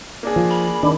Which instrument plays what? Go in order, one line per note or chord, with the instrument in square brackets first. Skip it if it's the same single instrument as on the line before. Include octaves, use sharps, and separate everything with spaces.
[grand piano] A#3 D4 G#4
[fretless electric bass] F3
[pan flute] B5
[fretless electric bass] D#3 [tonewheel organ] D4